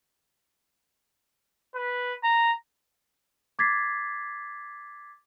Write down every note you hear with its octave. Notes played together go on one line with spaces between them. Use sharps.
B4
A#5
D6 G#6 A6 B6 C7